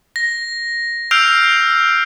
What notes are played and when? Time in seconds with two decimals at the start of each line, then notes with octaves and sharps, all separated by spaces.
0.16 A#6
1.11 E6 F6 G6 C7 D7 F7